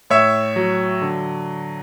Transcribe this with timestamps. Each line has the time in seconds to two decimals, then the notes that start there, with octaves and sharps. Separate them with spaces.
0.10 A2 C#5 E5
0.56 F#3
1.02 D3